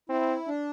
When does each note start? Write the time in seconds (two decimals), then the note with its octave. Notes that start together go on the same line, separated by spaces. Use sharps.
0.09 C4 E4
0.47 D4